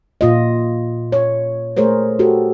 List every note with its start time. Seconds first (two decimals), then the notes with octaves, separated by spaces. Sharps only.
0.21 A#2 F4 D#5
1.12 C#5
1.77 A3 G#4 A#4 C5 C#5
2.19 F#4 G4 A4